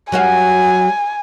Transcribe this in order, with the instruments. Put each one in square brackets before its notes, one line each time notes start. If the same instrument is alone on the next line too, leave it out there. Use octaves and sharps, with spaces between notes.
[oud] F#3 F#4 F5 [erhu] G#5